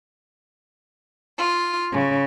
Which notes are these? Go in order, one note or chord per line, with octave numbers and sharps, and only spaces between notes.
F4
C#3